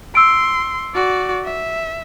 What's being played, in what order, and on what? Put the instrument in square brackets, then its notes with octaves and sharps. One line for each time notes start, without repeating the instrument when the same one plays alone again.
[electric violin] C6 [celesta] E6 D7
[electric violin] F#4 D5
E5